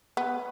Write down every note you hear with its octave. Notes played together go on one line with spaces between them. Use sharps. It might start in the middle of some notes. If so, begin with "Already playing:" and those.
B3